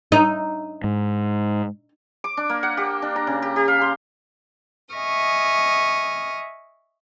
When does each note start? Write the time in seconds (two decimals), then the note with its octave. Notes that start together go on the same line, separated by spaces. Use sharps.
0.12 D#4
0.84 G#2
2.24 D6
2.37 D4
2.50 A#3
2.63 F#5
2.77 G4
3.02 D4
3.16 A#5
3.27 C#3
3.42 G4
3.56 G4
3.68 F5
3.82 C6
4.95 D#5 E5 G#5 C#6 D#6 F6